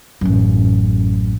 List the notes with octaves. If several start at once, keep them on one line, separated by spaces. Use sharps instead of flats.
A1 F#2